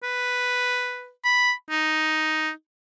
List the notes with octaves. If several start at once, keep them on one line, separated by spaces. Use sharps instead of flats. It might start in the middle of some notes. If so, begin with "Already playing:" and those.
B4
B5
D#4